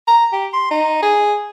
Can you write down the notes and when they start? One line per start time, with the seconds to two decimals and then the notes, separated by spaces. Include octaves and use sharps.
0.08 A#5
0.33 G4
0.53 C6
0.71 D#4
1.03 G#4